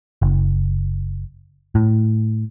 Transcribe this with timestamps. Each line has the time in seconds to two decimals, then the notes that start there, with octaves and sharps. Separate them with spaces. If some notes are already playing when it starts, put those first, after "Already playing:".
0.22 F#1
1.75 A2